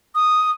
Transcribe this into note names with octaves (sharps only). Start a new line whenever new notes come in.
D#6